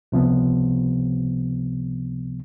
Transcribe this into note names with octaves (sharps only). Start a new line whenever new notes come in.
C#2 C3 F3 B3